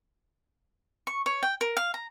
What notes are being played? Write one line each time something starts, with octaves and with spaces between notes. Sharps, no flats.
C#6
C#5
G5
A#4
F5
A#5